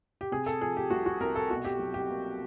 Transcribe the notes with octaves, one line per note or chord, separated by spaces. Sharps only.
G4
C3 G#4
A4
F3 G#4
G4
C2 F#4
F#4
C2 A#4
A4
B2 F#4
G4
F#3
G4
A#3